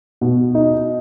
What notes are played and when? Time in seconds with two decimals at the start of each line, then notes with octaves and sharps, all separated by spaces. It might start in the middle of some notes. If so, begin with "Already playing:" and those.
0.21 B2
0.55 D#4